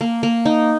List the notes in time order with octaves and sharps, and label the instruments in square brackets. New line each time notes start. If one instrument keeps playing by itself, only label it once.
[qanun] A#3
A#3
D#4